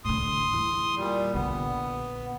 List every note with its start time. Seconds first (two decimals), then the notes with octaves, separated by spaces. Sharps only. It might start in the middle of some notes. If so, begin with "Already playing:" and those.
0.05 A2 D3 C6 D#6
0.53 E2
0.96 A#2 G3
1.34 A#1 D3 B3